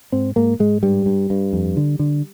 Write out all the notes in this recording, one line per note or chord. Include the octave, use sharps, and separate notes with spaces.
G#2 C4
G#2 A#3
G#2 G#3
G2 G3
G2
G2
F2
D3
D3